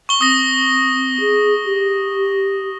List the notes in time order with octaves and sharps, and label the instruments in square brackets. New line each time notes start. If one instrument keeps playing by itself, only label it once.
[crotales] C#6 G7
[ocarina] C4 [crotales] D#6 A#6
[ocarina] G#4
G4